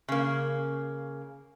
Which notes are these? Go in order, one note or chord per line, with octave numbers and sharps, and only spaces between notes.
C#3 A#3